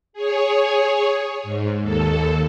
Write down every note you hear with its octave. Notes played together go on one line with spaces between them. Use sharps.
G#4 C#5
G#2
D#2 A4